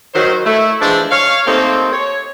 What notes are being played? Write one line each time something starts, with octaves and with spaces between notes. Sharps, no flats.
D#3 F#3 C5
A3 E4
E3 F3 G#3 D4
C#5 F5
A3 A#3 C4 D#4 G4 A4
C#5